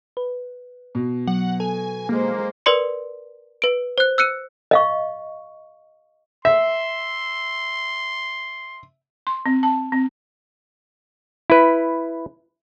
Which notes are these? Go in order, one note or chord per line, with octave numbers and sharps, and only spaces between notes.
B4
B2
F#3 F#5
A4 G#5
G#3 A#3 C5
A#4 B4 D5 C6 C#7
B4 D7
C5 F#6
E6 F#6 C#7 D#7
D#5 F5 C#6
E5 C6
C6
C4
A5
C4
E4 B4